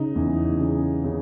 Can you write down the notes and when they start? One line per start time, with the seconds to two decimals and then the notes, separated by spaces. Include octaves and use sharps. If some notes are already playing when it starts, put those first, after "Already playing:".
Already playing: C#3 D#4
0.16 E2
0.60 C#3
1.04 C#3